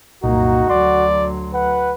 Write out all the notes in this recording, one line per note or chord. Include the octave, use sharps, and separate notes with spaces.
C2 F#2 A#2 A#3 D#4 F#4
D2 F#3 D5 C6
B4 F#5